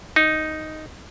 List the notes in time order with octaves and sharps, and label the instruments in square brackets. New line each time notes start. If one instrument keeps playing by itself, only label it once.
[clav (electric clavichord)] D#4